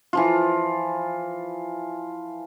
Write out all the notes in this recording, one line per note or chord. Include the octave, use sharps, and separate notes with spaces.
E3 F3 F4